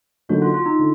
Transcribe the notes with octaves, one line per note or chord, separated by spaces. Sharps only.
D3 F#3 A#3 D#4 F#4
F4
F4
D#4
D3